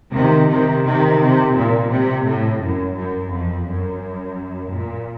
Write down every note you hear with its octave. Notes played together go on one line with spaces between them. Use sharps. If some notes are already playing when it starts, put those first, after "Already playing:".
C3 D#3
C3 D#3
C3 D#3
C3
A#2
C3
A2
F#2
F#2
F2
F#2
A#2